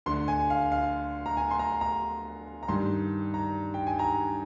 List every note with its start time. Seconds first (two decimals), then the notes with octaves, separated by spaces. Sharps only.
0.06 D2 D3 C6
0.28 G#5
0.50 F5
0.72 F5
1.26 A#5
1.37 G#5
1.51 C6
1.59 A#5
1.81 A#5
2.63 A#5
2.68 G2 D#3 C6
3.34 A#5
3.74 G5
3.87 G#5
3.99 A#5